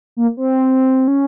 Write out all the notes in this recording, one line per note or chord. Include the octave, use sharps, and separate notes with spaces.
A#3
C4
C#4